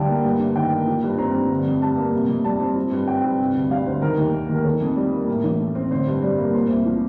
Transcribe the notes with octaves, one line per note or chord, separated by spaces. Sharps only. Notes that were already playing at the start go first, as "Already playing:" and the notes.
Already playing: D2 D3 G3 F5 G5 A5
A#3
G2
G1
D#3 G5
A#3
F3
G2
C4 A#5
G2
D3
F2
G3 A5
A#3
C3
F2
G3 A5
C4
F3
G2
C4 G5
G2
C3
D2
G3 F5
D2 C5
D#3 A#4
D#2
A#3
D#2
A#4
D#3 A4
F2
G3
A#3
A2 A#4
A1
A3
C4
D3 C5
G2
G3
A#3
A#2 C5
C2
F3